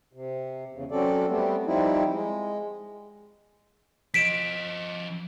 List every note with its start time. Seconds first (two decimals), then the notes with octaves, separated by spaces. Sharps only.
0.13 C3
0.73 E2 C#3
0.91 F#3 C4 C#4 A4 D5
1.28 G3 A3 B3 C4
1.66 F3 G3 C4 D#4 E4
2.11 G#3
4.14 F3 D#5 B6 D7 E7